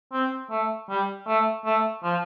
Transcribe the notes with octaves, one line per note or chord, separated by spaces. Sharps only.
C4
A3
G3
A3
A3
F3